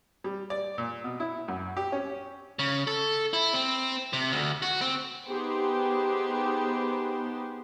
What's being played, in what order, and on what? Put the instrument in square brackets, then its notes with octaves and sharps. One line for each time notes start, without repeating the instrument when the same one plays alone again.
[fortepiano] G3
D5
A#2
B2
E4
F#2
G4
C#4
[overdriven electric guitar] C#3
A4
E4
C4
C3
D2
F#4
C4
[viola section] B3 D#4 G4 G#4 C5